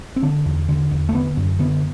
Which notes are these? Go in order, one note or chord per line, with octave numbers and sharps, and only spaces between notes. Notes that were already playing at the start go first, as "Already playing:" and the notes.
C4
D3 D4
E2
D3
E2
A3
D3 B3
F#2
D3 B3